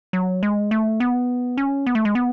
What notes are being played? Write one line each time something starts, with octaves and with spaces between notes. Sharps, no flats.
F#3
G#3
A3
B3
C#4
B3
A3
G#3
B3